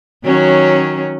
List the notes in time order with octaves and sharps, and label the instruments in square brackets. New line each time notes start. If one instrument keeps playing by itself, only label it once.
[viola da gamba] D#3 F#3 C#4